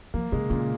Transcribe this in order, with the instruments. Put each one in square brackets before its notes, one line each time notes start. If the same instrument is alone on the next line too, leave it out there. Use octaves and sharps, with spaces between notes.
[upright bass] F3 [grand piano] A#3
[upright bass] C#3 [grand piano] G#3
[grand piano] A#2 [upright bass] C#3